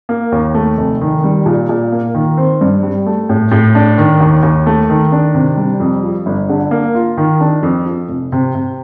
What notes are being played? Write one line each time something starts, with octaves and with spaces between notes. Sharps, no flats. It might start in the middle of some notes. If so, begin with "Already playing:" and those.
A#3
D#2
A3
F1
D#3
G3
A#2
A#2
A#3
D#3
C4
G2
G3
A3
A2
A2
D4
D#3
D#2
D#2
A3
D#3
D4
C3
G3
F2
F3
G1
D3
A#3
F4
D#3
D4
F2
F3
F1
C3
C3